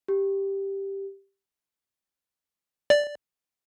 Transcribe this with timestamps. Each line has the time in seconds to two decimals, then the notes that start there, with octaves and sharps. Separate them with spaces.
0.08 G4
2.90 D5